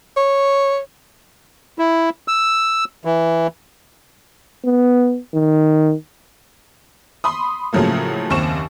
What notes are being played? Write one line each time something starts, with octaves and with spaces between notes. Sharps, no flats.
C#5
E4
E6
E3
B3
D#3
B5 C6 D#6
A2 C#3 F3 F#3 A3 A#3
F#1 D#2 C4 C#6 E7